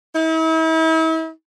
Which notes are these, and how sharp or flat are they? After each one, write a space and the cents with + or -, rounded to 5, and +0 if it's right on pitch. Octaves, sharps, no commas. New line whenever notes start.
E4 -40